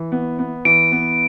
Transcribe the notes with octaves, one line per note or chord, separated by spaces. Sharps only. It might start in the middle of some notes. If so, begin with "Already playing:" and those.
Already playing: E3
B3
B3
E3 D7
B3